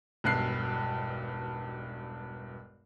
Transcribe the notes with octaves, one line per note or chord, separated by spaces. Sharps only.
E1 B1 G2 F#6 C7